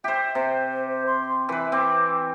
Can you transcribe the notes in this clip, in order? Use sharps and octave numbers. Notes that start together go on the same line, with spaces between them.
G4 C5 E5
C3 C5
C6
E3 B4 E5
C4 D6